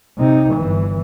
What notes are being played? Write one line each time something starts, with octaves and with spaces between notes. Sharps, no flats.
C3 D#4
G1 E3